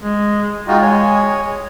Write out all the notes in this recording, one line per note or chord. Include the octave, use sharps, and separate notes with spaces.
G#3
G#3 D#4 F4 F#4 G5
C#5 G#5